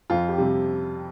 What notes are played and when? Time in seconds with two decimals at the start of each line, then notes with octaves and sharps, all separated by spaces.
0.10 F2 F4
0.29 G4
0.38 C3 G3